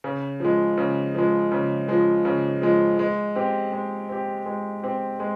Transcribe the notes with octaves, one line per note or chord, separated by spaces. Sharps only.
C#3
F3 G#3
C#3
F3 G#3
C#3
F3 G#3
C#3
F3 G#3
G#3
C4 G4
G#3
C4 G4
G#3
C4 G4
G#3